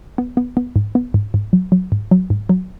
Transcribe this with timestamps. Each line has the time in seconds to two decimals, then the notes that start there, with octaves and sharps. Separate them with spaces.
0.18 B3
0.37 B3
0.57 B3
0.76 G#2
0.95 B3
1.14 G#2
1.34 G#2
1.53 F#3
1.72 F#3
1.92 G#2
2.11 F#3
2.30 G#2
2.49 F#3